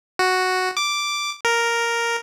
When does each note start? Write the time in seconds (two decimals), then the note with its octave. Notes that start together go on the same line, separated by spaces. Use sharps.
0.19 F#4
0.77 D6
1.45 A#4